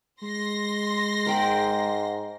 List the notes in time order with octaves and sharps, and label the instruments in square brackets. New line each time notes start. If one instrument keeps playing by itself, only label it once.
[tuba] G#3 [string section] C6 A#6
[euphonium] G#2 [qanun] A#4 G5 B5